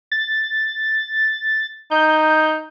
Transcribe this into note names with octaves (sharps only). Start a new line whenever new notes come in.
A6
D#4 G6